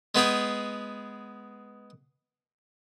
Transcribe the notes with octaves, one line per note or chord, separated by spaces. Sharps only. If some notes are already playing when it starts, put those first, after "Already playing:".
G#3 B3 G#4 G5